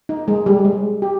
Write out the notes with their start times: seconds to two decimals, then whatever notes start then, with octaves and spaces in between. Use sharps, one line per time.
0.09 D#4
0.28 G#3
0.46 G3
0.65 G#3
1.02 G4